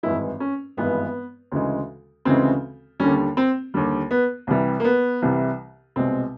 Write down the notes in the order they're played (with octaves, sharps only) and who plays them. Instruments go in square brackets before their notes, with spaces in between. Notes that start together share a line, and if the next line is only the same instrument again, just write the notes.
[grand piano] G#1 G2 E3 G#3 E4
C#4
G#1 G2 E3 G#3 B3
D2 C#3 E3 G#3
D2 C#3 E3 G#3 C4
D#2 D3 G3 C#4
C4
D#2 D3 G3
B3
C2 C3 E3 G3
A#3
B3
C2 C3 E3 G3
C2 B2 G#3 C4